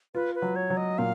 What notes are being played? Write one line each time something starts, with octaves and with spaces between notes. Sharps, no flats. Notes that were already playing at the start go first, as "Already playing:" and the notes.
F4 B4
B4
F#3
C#5
F#3
D#5
A#2 F5